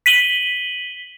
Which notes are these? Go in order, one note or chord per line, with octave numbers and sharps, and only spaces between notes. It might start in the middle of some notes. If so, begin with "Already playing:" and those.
B6 D#7 F#7 G7